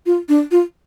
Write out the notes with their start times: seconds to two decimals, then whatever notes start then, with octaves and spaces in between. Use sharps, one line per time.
0.06 F4
0.29 D4
0.51 F4